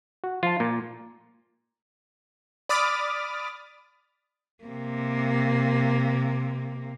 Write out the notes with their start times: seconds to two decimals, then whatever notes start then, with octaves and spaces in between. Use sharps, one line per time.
0.24 F#4
0.43 F3 F4 A5
0.60 A#2 A#3
2.69 D5 B5 D6 D#6 F6 A6
4.64 C3 A#3